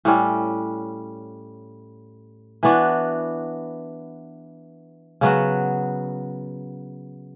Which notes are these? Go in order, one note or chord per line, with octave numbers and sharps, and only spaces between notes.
A2 G3 C#4
E3 B3 D4 F#4
C#3 F#3 B3 F#4